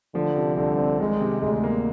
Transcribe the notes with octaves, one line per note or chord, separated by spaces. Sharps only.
D3 F3
C3
C2 D3
C4
D#3 G#3
C3
D2 G#3
A#3